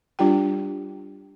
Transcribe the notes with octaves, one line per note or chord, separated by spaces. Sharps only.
G3 D4 F4 G4 G5